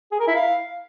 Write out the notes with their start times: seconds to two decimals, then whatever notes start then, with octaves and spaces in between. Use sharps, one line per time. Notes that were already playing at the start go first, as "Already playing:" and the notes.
0.11 G#4
0.19 A#4
0.27 E4
0.35 F5